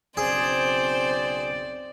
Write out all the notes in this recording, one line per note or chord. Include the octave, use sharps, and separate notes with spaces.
B1 C#3 C4 G#4 C5 D5